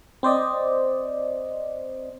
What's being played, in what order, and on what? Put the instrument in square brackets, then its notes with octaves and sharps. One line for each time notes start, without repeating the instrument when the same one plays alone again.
[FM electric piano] C4 C5 D5 D#5